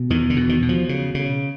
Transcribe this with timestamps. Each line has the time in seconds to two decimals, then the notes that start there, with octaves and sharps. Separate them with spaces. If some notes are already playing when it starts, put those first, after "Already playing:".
Already playing: B2
0.10 E2 D#3
0.30 D3
0.36 B2
0.49 D#3
0.62 B2
0.69 F3
0.89 C#3
1.15 C#3